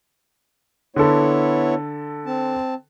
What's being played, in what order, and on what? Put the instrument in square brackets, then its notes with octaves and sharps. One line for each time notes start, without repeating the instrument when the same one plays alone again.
[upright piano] D3 A4 [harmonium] B3 E4 C#5
[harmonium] C4 A5